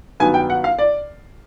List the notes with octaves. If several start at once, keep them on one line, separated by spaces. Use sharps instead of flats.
G2 D#3 F#3 B3 G#5
G5
F#5
F5
D5